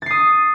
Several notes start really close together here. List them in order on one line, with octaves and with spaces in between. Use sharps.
A6 C7 D#6